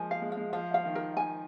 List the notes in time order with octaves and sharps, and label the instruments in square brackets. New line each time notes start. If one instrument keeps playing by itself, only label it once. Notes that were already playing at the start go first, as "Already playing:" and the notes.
Already playing: [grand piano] F3 G#3 A#3 [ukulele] G#5
[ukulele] F5
[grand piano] G#3
[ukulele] F5
[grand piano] G#3
[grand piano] F3 [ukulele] F5
[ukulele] F5
[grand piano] D#3
[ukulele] A#4
G#5